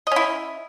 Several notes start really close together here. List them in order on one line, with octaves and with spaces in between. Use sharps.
D#5 C#4 E4